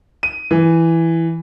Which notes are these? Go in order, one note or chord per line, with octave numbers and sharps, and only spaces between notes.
D#7
E3